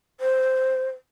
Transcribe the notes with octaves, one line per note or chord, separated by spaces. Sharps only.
C5